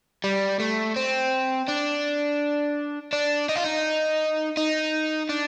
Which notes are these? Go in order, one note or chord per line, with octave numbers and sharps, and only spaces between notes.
G3
A3
C4
D4
D4
D#4
F4
D#4
D#4
D4